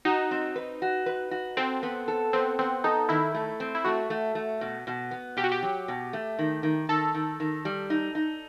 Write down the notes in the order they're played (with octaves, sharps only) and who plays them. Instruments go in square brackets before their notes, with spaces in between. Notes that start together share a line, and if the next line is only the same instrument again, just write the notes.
[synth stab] D#4 [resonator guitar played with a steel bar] F#4
[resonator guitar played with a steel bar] C4
B4
F#4
B4
F#4
[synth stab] C4 [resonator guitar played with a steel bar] A4
[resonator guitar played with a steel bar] B3
A4
[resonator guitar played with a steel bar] B3 [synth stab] C4
[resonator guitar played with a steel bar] B3 [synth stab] C4
[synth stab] D#4 [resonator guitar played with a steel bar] A4
[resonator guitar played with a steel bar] D#3 [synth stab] E4
[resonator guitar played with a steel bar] A3
C4
[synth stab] E4
[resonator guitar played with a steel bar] A3 [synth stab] F#4
[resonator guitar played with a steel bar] A3
A3
B2
B2
B3
[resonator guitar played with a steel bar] B2 [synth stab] G4
[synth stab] F#4
G4
[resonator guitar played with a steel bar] F#3
B2
A3
D#3
D#3
[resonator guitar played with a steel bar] D#3 [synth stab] A4
[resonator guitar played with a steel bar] D#3
D#3
G3
D#4
D#4